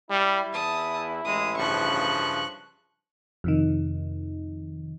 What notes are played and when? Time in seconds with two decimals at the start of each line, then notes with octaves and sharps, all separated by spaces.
0.11 G3 E4
0.53 E2 A5 D#6
1.25 A1 G#3 D#6
1.57 G2 C#3 F3 C#6 F#6
3.44 F2 C3 D#3